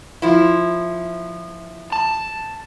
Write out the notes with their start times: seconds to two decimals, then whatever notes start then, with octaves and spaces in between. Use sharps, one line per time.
0.22 F3 E4
1.92 A5